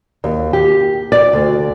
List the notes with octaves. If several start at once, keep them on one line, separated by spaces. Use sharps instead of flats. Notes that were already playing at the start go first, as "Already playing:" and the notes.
D#2
G4
D5
D2